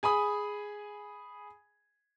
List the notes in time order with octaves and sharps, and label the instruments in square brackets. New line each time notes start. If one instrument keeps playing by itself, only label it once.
[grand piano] G#4 G#5 B5 D#6